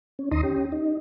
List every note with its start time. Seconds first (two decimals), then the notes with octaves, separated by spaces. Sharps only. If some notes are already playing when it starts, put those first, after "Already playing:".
0.19 C#4
0.31 D#2 D#4 A#5 C6 D#6
0.43 C#4 G4
0.72 D#4